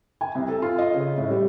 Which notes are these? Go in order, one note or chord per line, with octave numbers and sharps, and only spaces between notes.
G#5
C2
A4
F4
D#5
C#3
A2
G3